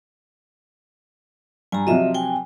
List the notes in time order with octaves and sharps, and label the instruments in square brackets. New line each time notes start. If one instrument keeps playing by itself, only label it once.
[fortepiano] G2 [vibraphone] G#5 A#5
[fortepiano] C3 F3 F#3 [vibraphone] D#5 E5
[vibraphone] G5 G#5